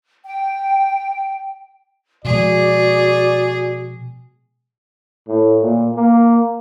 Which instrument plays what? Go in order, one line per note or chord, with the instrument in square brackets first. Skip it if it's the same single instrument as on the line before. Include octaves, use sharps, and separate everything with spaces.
[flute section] G5
[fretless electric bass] B2 F3 G#3 [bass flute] F#4 [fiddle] G#4 [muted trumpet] D5
[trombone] A2
A#2
A#3